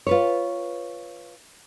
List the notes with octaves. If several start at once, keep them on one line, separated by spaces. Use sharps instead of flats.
F4 B4 C#5